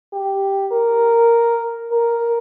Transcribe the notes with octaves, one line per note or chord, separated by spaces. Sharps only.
G4
A#4
A#4